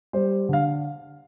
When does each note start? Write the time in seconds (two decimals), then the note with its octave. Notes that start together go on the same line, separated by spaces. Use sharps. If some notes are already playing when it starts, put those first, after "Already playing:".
0.13 G3 C5
0.49 D3 F5